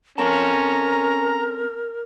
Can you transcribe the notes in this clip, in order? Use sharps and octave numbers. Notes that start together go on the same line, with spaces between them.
C4 C#4 A4 A#4 A5 A#5